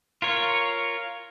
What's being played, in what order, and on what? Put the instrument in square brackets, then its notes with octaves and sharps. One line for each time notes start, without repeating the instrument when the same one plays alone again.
[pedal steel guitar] F4 A#4 C#5